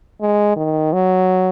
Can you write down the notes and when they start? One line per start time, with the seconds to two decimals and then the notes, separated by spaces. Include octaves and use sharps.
0.21 G#3
0.56 D#3
0.93 F#3